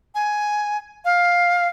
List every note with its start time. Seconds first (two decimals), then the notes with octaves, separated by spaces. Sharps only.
0.15 G#5
1.05 F5